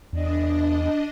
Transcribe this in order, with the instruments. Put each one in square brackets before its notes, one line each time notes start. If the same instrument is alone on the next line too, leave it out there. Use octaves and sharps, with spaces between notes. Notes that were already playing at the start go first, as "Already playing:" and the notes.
[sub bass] E2 [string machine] D4 D#5